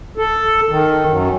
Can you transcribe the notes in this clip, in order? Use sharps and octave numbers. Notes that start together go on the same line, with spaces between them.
A4
D#3
F#2